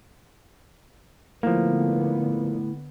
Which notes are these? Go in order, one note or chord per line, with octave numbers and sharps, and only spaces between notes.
A2 D3 F3 A#3 B3